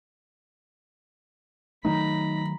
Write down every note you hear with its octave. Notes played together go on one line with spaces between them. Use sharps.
D#3 F#3 A3 D#4 A#5 B5